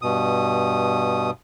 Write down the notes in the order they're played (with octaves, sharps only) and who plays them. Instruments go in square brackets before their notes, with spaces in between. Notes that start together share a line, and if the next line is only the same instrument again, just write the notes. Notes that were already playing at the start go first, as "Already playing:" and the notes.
[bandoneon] G2 B2 D#6